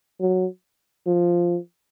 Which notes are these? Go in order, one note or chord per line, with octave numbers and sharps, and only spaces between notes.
F#3
F3